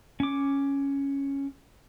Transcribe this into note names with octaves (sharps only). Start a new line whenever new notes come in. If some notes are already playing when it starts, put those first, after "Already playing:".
C#4 D6